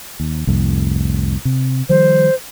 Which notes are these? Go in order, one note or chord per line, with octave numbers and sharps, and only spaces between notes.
D#2
C2 F2 A2
C3
D#3 F3 G3 C5